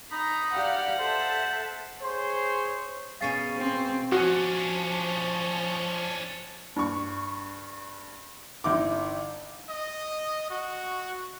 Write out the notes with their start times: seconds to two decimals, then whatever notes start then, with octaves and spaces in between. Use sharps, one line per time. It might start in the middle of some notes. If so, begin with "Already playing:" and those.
0.12 D#4 A#5 B5
0.53 G4 D5 F5 F#5
0.99 A4 C5 E5 A5
2.02 G#4 C5 C#5 C6
3.21 B2 C#4 G#4 F5 A6 C7
3.57 C4
4.12 F3 C#4 D4 F#4
6.76 G2 C#6
8.64 G1 D#4 E4 D6
9.69 D#5
10.50 F#4